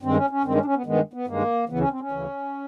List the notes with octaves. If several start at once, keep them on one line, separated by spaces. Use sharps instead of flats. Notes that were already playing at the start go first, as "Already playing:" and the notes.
G2 D#3 G#3 C4
C#4
C#4
G2 D#3 G#3 C4
C#4
D4
C#4
B3
G2 D#3 G#3 B3
B3
G2 D#3 G#3 A#3
D2 C#3 E3 B3
C#4
C4
C#4
D2 C#3 E3